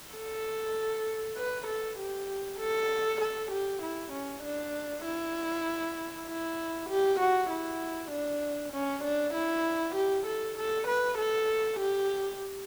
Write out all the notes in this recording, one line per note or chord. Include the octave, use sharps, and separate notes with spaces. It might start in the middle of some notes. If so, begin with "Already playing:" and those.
A4
B4
A4
G4
A4
A4
G4
E4
C#4
D4
E4
E4
G4
F#4
E4
D4
C#4
D4
E4
G4
A4
A4
B4
A4
G4